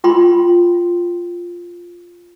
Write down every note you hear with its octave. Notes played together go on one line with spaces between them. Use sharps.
F4 G5 B5 C6